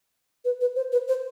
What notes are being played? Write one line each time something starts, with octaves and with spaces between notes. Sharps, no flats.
B4
B4
C5
B4
C5